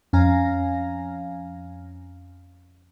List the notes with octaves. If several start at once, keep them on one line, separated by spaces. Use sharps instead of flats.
F2 C#4 F5 G#5 A#5 A#6